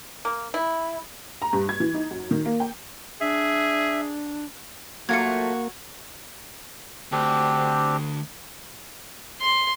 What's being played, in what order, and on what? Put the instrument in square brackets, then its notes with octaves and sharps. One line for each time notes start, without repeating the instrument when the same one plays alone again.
[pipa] A#3
E4
[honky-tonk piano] A#5
G2
G#6
E3
D#4
F#2
D#3
A#3
G5
[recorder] D4 [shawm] G#4 [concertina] E5
[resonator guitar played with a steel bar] F#3 A3 F4 [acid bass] A#3 [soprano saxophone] F#4 [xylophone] G#6 C#7
[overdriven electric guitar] D2 [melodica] C4 D4 G4
[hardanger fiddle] C6